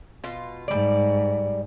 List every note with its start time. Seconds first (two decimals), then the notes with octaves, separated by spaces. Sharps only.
0.24 B2 F4
0.68 G#2 G3 D5